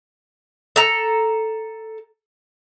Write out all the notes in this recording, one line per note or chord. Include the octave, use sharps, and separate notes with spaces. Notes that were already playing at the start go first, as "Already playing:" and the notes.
A4 A#5